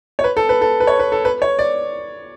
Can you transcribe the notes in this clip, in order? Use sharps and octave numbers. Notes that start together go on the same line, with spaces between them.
C#5
B4
A4
B4
A4
B4
C#5
B4
A4
B4
C#5
D5